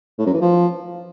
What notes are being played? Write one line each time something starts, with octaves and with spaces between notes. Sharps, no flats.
A2
F#2
E3
F3